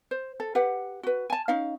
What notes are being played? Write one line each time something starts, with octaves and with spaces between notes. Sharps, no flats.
C5
A4
G4 B4 F#5
F#4 B4
G#5 A5
C#4 D#4 F5